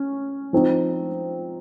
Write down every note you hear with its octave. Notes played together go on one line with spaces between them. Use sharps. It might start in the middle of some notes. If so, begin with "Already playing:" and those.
Already playing: C#4
F3 C4 D#4